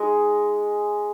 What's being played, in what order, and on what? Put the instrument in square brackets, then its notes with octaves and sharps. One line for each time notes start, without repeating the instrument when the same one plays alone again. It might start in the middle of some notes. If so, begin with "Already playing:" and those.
Already playing: [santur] G#3 D#4 G#4